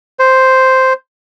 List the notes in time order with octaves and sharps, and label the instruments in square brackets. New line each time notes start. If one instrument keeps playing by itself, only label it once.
[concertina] C5